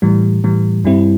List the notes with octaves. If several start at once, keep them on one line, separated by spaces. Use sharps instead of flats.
A2 E3 G3
A2 E3 G3
G2 G3 C4 E4